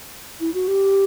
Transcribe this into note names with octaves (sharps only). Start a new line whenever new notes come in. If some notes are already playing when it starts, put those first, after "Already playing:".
E4
F#4
G4